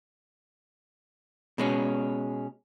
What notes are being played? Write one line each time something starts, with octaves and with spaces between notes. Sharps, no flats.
B2 G#3 C#4